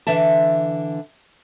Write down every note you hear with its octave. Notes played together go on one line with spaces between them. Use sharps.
D3 E3 E5 A5